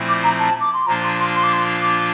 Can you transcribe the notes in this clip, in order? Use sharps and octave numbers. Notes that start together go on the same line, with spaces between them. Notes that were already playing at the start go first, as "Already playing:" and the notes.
Already playing: A#2 F3 A3 C4 E4
D6
A#5
A5
D6
C6
A#2 F3 A#3 D4 F4 A#5
C6
C6
C6
D6
C6
D6